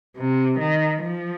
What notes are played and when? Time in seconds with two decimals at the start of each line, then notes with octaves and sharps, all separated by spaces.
0.17 C3
0.59 D#3
1.03 F3